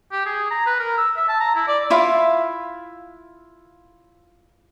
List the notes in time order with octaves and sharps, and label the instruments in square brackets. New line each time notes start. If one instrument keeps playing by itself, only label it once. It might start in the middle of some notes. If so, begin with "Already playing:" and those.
[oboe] G4
G#4
A#5
B4
A#4
E6
E5
A5
A#5
E4
D5
[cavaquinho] E4 F4 E5 F5